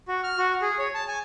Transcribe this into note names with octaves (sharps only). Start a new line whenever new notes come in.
F#4
F6
F#4
G#4
C#5
A5
G#5